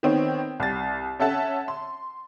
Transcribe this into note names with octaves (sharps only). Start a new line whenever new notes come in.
D#3 B3 C4 C#5
C2 A6
C#4 A4 E5 F#5 A5
C6